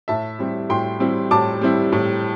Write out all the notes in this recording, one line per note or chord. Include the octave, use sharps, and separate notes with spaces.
A2 E5 A5
G3 C4 E4
A2 G5 C6
G3 C4 E4
A2 A5 D6
G3 C4 E4
A2